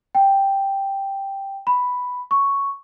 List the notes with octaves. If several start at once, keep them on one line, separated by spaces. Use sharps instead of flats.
G5
B5
C#6